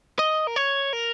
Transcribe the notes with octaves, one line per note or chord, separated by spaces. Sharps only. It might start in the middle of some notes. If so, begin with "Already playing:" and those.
D#5
A#4
C#5
A#4